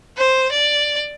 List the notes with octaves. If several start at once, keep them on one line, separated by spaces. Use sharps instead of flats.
C5
D5